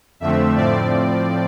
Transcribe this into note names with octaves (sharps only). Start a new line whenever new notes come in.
F2 D3 F3 A3 C4 E5
A2 F3 C4 D5